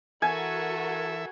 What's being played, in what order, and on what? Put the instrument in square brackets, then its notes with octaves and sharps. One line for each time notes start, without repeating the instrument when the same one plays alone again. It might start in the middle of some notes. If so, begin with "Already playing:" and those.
[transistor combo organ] E3 E5 [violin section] F#4 A#4 [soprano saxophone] A4 [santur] G#5